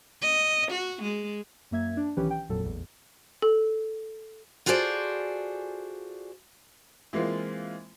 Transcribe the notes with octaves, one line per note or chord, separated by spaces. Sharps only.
D#5
F#4
G#3
F#2 A#3 E5 G#6
D4
B1 D#3 E3 C#4 G4 B4
G5
G#1 F2 A#2 F#3 A4
A1 E2
A4
F4 F#4 G#4 A4 C5 D5
E3 G#3 A#3 C4 F4